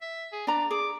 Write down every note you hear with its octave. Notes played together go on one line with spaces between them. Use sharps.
E5
G#4
D4 D5 A#5
G#4 D6